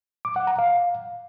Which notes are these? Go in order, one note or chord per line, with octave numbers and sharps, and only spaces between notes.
D6
F#5
A#5
F5